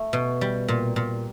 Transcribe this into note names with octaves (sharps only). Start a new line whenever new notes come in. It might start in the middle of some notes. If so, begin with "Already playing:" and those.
Already playing: A3
B2
G3
A#2
A#2